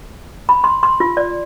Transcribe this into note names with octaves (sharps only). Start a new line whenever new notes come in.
B5
C6
C6
F4
D5